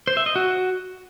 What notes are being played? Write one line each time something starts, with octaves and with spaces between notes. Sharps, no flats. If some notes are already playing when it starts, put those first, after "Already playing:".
C5
E5
D#5
F#4